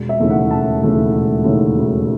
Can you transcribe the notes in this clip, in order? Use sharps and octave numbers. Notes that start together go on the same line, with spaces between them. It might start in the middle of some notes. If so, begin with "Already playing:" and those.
Already playing: E1
E5
D#2 C#3 E3 A3
F#5
E1 A5
D#2 C#3 E3 A3
E1
D#2 C#3 E3 A3
E1